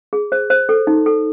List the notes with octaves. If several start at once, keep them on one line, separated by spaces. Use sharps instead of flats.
G#4
C5
C5
A4
D#4
A4